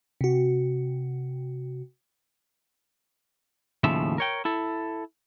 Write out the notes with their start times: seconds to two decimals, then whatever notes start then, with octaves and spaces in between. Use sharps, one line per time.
0.21 C3 F#4
3.84 D#2 A2 C#3 F3 E5
4.18 A#4 C#5 G5
4.45 E4 A4